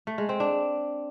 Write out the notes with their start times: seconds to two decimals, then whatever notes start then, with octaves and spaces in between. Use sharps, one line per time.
0.07 A3
0.18 G#3
0.29 C4
0.40 D4